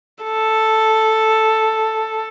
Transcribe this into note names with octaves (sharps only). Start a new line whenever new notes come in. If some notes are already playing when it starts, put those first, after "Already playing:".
A4